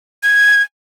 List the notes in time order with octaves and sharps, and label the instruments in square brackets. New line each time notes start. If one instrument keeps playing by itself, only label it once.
[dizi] G#6